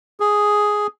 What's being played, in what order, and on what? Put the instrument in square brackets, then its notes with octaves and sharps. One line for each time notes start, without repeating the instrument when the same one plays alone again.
[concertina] G#4